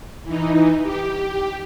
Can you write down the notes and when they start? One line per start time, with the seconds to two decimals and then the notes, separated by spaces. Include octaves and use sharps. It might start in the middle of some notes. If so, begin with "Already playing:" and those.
0.24 E3 D#4
0.83 G4